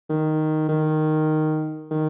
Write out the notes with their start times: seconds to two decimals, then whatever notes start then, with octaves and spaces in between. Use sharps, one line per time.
0.10 D#3
0.69 D#3
1.91 D#3